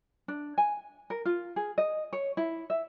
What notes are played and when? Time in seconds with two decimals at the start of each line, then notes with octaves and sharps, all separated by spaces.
0.28 D4
0.58 G#5
1.10 A#4
1.25 F4
1.56 G#4
1.78 D#5
2.13 C#5
2.37 E4
2.70 E5